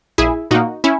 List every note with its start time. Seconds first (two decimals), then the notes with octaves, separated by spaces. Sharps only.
0.18 A#1 E4 G#4
0.51 A#2 A#3 D#4 F#4
0.84 C#4 E4